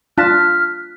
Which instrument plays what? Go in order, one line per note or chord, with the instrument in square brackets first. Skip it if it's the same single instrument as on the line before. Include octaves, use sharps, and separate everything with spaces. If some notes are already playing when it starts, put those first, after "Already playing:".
[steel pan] D4 F4 A5 [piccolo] F6 [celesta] F#6 B6